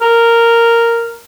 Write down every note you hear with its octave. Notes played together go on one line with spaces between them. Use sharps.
A#4